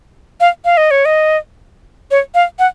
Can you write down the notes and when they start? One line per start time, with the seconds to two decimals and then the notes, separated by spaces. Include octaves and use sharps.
0.41 F5
0.65 F5
0.77 D#5
0.91 C#5
1.05 D#5
2.11 C#5
2.35 F5
2.59 F#5